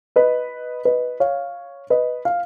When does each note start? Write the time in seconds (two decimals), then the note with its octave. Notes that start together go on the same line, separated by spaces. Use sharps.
0.16 B4 D#5
0.85 B4 D#5
1.20 C#5 F5
1.90 B4 D#5
2.25 F5